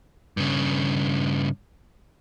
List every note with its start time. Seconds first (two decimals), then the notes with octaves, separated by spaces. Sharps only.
0.37 G2 C#3